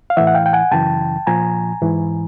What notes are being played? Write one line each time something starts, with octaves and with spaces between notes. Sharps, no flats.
F5
A2 E3 E5 F#5
F#5
F5 G5
G5
F#5 G#5
F#2 C#3 E3 G5 A5
A#2 F3 G#5 A#5
G#2 E3